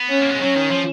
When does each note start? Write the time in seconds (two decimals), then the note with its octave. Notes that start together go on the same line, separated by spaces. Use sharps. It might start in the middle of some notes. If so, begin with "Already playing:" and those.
Already playing: B3
0.10 C#4
0.21 A#3
0.31 G#3
0.40 F#3 C#4
0.56 D#3
0.72 F3